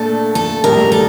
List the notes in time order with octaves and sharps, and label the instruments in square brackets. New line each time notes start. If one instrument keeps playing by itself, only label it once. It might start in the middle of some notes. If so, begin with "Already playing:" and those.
Already playing: [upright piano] A#2 A3 D4 [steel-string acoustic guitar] A4
[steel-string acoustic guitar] A4
[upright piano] A#1 A2 G3 [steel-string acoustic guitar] A#4
[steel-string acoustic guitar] A4